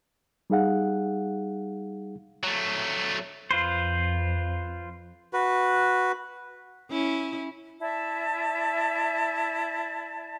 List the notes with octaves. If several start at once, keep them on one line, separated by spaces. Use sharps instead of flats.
G3 D#4 G#4 F5 F#5
F#3 A3
F2 F4 B4 C5
F#4 B4
C#4 E4
E4 D5 E5 A5